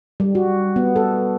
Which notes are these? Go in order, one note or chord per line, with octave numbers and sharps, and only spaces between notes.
G3
F#4
B3
A4